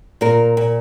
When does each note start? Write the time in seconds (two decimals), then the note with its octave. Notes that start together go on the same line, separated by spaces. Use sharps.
0.21 A#2 A#4
0.57 A#2